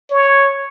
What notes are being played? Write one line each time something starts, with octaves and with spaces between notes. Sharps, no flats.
C#5